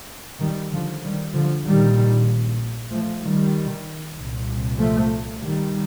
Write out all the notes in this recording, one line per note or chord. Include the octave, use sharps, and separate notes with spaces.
D#3 G3
D3 F3
D#3 G3
D3 F3
A#1 A#2 D#3 G3
F3 A3
D#3 G3
C2 A#2
F3 A3
D#3 G3